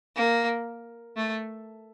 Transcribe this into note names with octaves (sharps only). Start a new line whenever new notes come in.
A#3
A3